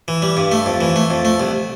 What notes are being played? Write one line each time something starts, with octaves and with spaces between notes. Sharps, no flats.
E3
G3
G2
A3
F2
E3
A3
F2
A3
C2